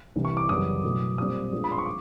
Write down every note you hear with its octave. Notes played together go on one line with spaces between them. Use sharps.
C2 C3 E3
C#6
D6
F#2 C#3 E3 G3 B3 D#6
B2 F#3 A3
A#2 G3 C4 D#6
A#2 F3 G#3 B3 D4
B5
C6
C#6
D6